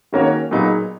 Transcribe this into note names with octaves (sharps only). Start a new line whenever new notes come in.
D#3 A#3 C#4 F#4 C#5
A#2 F#3 B3 D#4 G#4